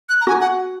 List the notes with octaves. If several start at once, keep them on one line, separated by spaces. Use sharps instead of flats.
F#6
A#5
F#4 G#5
F#5